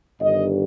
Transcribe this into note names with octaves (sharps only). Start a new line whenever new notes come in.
G1 G2 D#3 G3 D#5